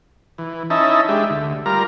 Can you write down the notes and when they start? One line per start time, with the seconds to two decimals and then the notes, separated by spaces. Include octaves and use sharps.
0.38 E3
0.70 C#4 D#4 E4 D#5 E5 A5
1.09 G#3 D4 G4 E5
1.30 D2
1.66 G3 F4 A#4 A#5